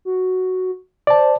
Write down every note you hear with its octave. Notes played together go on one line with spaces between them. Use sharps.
F#4
C5 D5 A5